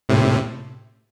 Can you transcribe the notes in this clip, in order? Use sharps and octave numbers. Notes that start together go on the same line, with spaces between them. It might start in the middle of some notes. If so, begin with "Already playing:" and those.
A2 C3